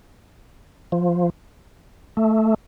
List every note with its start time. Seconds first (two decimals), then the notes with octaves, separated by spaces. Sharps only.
0.92 F3
2.17 A3